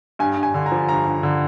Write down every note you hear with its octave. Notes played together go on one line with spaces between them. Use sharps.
G2 G#5
G2
G#5
D3
A#5
F3
G2 A#5
G2
D3